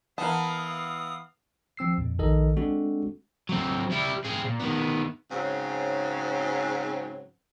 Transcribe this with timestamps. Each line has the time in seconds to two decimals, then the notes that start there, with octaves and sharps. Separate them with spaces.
0.18 E3 B3 A#4 F5 A5 D#6
1.77 F3 C4 E6 C7
1.98 F2 A#2
2.19 A#1 D#3 A4 A#4 D#5
2.57 G#3 C4 D4 F#4 A4
3.49 F#3 C4
3.91 G3 E4
4.24 C4 G#4
4.44 A#2
4.60 D#3 B3
5.31 G#2 C#3 F#3 C4